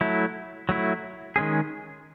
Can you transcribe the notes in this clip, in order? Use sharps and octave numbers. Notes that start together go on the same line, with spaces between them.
F#3 A3 E4
F#3 A3 E4
D#3 G#3 C#4 G#4